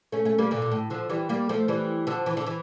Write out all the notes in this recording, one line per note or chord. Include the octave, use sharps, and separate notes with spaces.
A3 C#4
A3 C#4
G3 A#3
A#2 D3
A#2
A2
D3 F3
E3 G3
G3 A#3
F3 A3
E3 G3
D3 F3
E3
D3
E3